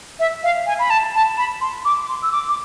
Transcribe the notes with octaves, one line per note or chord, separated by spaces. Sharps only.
E5
F5
G#5
B5
A5
A5
B5
C6
D6
C6
E6
D6
D6